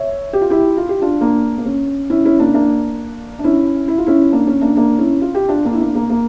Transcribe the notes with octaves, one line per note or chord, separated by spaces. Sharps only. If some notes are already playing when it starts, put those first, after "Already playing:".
Already playing: C#5 E5
G4
F4
E4 G4
F4
G4
D4 F4
A#3 D4
A#3
C#4
C#4 E4
C#4 E4
A#3 D4
A#3 D4
D4
C#4 E4
E4
F4
C#4 E4
A#3 D4
C#4
A#3 D4
A#3 D4
C#4 E4
F4
G4
D4 F4
A#3 D4
E4
A#3 D4
A#3
A#3